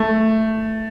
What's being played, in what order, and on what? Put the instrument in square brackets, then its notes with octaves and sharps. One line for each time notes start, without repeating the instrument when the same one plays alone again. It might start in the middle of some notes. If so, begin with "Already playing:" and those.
Already playing: [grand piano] A3